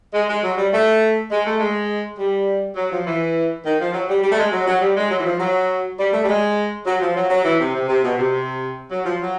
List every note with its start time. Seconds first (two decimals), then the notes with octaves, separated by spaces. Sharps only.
0.14 G#3
0.28 G#3
0.42 F#3
0.57 G3
0.72 A3
1.31 G#3
1.45 A3
1.60 G#3
2.18 G3
2.76 F#3
2.91 F3
3.06 E3
3.64 D#3
3.79 F3
3.93 F#3
4.08 G3
4.23 G3
4.30 A3
4.37 G#3
4.52 F#3
4.66 F#3
4.81 G3
4.96 G#3
5.10 F#3
5.18 E3
5.25 F3
5.39 F#3
5.98 G3
6.13 A3
6.22 G3
6.28 G#3
6.86 F#3
7.01 F3
7.15 F#3
7.30 F#3
7.44 E3
7.59 C3
7.74 C3
7.88 C3
8.03 B2
8.18 C3
8.91 F#3
9.05 F3
9.20 F#3